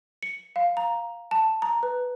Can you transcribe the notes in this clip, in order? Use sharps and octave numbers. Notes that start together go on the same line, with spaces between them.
C#7
F5
A#5
A5
A#5
B4